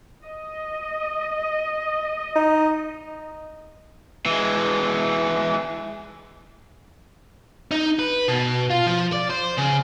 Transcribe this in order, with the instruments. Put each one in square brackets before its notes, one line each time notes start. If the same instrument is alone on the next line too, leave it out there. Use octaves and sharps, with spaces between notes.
[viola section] D#5
[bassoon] D#4
[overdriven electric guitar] E3 G#3
D#4
B4
B2
F4
F3
D5
C5
C#3